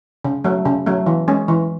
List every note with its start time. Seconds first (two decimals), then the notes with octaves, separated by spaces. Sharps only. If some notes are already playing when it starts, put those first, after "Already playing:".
0.25 C#3
0.44 F#3 A3
0.65 C#3
0.86 F#3 A3
1.06 E3
1.28 G#3 C#4
1.48 E3